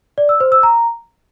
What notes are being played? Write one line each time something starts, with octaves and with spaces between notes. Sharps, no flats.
D5
E6
C5
E6
A#5